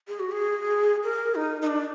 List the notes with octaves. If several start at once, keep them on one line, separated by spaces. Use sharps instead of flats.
G#4
F#4
G#4
A#4
D#4
D#4
D4